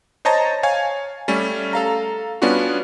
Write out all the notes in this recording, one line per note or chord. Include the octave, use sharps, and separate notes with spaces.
C5 C#5 D#5 A5 A#5 A6
C#5 F5 G#5 G#6
G3 A3 C#4
A4 F5 A#5
G3 B3 C#4 D4 F4 F#4